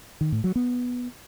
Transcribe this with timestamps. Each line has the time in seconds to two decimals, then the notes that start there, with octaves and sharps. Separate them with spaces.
0.21 D#3
0.32 A2
0.44 F#3
0.56 B3